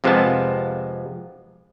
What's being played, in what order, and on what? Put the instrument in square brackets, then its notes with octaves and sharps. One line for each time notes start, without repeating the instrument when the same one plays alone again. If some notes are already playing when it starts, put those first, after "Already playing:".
[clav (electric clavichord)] F2 C3 F3 G#3 B3 A5